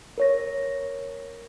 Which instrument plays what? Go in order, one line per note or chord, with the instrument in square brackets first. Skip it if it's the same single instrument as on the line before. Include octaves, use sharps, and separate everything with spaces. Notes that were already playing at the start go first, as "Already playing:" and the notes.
[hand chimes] A#4 C#5 A#6